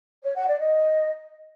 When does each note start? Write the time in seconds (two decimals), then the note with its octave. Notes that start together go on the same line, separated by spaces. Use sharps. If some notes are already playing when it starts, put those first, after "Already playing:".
0.24 C#5
0.35 F#5
0.47 D5
0.59 D#5